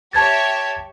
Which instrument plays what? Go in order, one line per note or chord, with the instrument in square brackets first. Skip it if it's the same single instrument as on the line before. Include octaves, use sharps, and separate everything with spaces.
[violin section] G4 C#5 E5 [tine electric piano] A5 G#6 A6